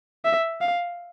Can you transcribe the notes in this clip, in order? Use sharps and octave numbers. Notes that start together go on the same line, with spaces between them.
E5
F5